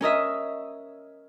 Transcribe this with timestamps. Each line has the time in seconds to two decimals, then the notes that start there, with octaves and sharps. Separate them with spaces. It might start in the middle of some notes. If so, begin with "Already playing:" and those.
0.01 C#4 A#4 D#5 E5